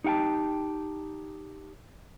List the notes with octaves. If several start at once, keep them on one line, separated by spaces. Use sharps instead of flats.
D#4 G4 F#5 G5 A5